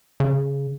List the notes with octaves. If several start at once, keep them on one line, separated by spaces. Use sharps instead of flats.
C#3